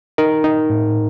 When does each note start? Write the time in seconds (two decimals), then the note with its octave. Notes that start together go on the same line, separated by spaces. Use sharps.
0.18 D#4 A#4
0.44 D#4
0.70 A2